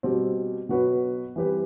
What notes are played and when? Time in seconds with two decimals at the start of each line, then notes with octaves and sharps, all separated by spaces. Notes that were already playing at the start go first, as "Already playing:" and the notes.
0.03 B2 G3 C4
0.69 B2 F#3 B3 F#4 B4
1.36 E3 G3 C4 G4 B4